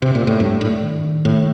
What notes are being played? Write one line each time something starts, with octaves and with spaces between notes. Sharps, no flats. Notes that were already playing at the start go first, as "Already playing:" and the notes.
C3
A#2
A2
G2 D4
A2 D4
D#3
D#3
C2 A2